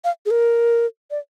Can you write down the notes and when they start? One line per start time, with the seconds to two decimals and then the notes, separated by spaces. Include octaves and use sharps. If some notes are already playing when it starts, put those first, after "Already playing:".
0.04 F5
0.26 G#4
0.31 A#4
1.11 D5